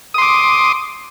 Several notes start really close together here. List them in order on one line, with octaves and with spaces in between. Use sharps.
D#6 C6 D6